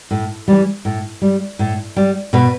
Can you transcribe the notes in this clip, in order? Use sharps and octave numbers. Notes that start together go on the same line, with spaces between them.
A2
E3 G3
A2
G3
A2
G3
B2 B4